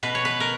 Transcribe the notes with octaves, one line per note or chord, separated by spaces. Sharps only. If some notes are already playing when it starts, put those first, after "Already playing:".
B2 B4
C#5
B4
A#4